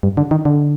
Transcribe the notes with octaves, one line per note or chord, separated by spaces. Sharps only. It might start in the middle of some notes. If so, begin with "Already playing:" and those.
G2
D3
D#3
D3